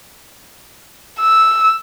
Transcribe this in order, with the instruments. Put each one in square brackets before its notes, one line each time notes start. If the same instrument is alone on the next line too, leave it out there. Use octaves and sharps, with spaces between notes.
[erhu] E6